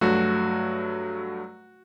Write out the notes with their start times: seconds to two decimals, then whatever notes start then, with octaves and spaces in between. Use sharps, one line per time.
0.01 G2 F#3 A3 F#4